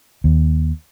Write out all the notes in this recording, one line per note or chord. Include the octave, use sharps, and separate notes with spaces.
D#2